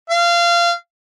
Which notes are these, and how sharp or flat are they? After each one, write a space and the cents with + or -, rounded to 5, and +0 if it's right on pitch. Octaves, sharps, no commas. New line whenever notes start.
F5 -20